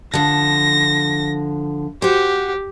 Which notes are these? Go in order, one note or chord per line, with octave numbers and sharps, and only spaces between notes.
D3 F3 A#6
F#4 G4 C5